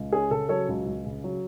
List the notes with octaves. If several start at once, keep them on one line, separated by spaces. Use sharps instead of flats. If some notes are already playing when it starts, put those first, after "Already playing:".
Already playing: C#2
C#4 G#4
C#3 A4
F#3 A4 C#5
C#2
C#2
C#3
F#3